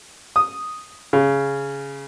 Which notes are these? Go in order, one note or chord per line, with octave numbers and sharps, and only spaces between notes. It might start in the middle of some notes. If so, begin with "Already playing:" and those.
D#6
C#3